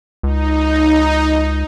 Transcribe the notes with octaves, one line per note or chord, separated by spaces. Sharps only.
C#2 D#4